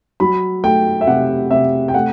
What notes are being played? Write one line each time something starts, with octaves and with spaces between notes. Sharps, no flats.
F#3 B5
A3 G5
E5
C3 F#5
C3 E5
G5
A3 F#5